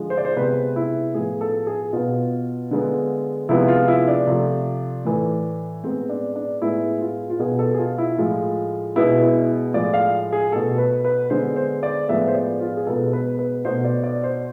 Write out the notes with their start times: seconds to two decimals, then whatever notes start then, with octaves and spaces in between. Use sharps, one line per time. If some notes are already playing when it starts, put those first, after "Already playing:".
Already playing: D3 F3 G#3
0.10 C5
0.18 D5
0.25 C5
0.37 C3 G#3 B3 B4
0.76 E4
1.14 A2 F3 B3 G#4
1.41 A4
1.67 G#4
1.93 B2 B3 F4
2.71 D3 G#3 B3
3.49 C3 F3 G#3 B3 E4
3.68 F4
3.88 E4
4.08 D4
4.27 C3 F3 A3
5.05 A2 E3 A3
5.84 A2 G#3 B3 C4
6.09 D4
6.36 D4
6.62 A2 G#3 B3 E4
7.01 F4
7.30 F4
7.39 B2 B3 G#4
7.59 A4
7.74 G#4
7.79 F4
7.98 E4
8.18 A2 F3 G#3 F4
8.96 B2 G#3 B3 E4
9.22 E4
9.74 A2 F3 G#3 D5
9.94 F5
10.33 G#4
10.52 B2 A3 A4
10.78 B4
11.05 B4
11.30 D3 G#3 B3 C5
11.56 C5
11.83 D5
12.08 A2 F3 G#3 B3 E5
12.28 C5
12.35 D5
12.60 F4
12.77 G#4
12.87 B2 G#3 B3 A4
13.13 B4
13.39 B4
13.65 B2 A3 C5
13.84 D5
14.04 D5
14.24 C5